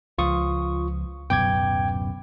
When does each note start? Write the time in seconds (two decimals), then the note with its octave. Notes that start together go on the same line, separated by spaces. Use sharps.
0.18 C#2 F3 F4 C#6 D#6
1.30 D1 F#2 B2 G5 D6 G#6